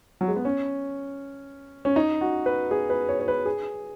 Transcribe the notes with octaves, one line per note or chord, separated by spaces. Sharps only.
F#3
G#3
B3
C#4
C#4
D#4
F#4
B4
G#4
B4
C#5
C#5
B4
G#4